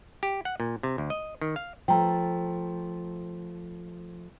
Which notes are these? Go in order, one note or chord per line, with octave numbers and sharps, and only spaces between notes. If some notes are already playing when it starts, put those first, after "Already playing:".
G4
F#5
A#2
C3
D2
D#5
D#3
F5
F3 A3 G5 A#5